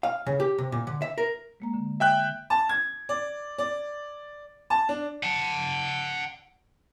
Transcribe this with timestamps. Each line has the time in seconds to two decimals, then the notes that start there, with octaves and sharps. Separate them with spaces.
0.03 F5
0.26 C#3
0.40 G4
0.58 C3
0.72 A#2
0.87 D3
1.02 E5
1.18 A#4
1.60 G#3 A#3 A#5
1.74 D3
2.00 E5 G5 F#6
2.50 A5
2.69 G#6
3.09 D5
3.58 D5
4.70 A5
4.89 D4
5.23 F#5 A5